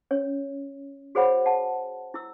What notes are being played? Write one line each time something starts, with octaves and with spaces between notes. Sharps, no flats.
C#4 C#5
F#4 G#4 C5 C#5 F#5 B5
F#5 A5
E4 E6